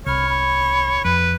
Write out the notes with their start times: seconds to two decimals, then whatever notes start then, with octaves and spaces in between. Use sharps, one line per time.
0.06 C2 C#5 B5 F6
0.29 B5
1.05 F2 B4